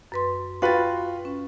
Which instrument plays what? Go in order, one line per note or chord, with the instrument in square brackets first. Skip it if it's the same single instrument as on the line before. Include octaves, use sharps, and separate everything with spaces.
[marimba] F#2 B4 C6
[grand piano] F4 F#4 B4 [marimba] G5 A6
[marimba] C#4